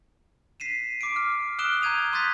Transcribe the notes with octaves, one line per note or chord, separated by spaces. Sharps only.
B6 C7 D#7 E7
D6 C7 D7
F6
D#6 F6 F#6 D7 E7 G7
A#5 G6 G#6 D#7 F7
C6 D#6 F#6 G6 A6 B6